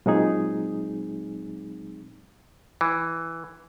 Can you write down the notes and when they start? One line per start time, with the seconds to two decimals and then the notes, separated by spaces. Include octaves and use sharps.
0.06 A#2 F#3 G#3 C4 D#4 G#4
2.81 E3